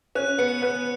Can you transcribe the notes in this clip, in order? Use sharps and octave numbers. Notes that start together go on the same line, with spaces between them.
C#4 F#6
B3 C#7
B3 F#6